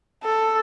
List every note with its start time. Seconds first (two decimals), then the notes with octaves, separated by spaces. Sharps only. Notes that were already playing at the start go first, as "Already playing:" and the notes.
0.23 A4